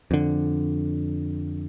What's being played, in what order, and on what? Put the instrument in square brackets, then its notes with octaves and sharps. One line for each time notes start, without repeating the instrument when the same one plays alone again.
[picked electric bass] F2 D3